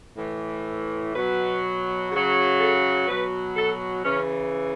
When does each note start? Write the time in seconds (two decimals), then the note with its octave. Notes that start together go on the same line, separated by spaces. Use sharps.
0.17 A2 E3
1.14 B2 F#3 B4
2.11 C#3 F#3
2.59 A4
3.07 B2 F#3 B4
3.55 A4
4.04 C#3 E3 C#4